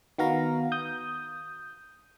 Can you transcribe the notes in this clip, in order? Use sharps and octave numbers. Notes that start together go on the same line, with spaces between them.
D#3 B3 F#4 F5 A#5
D#6 G6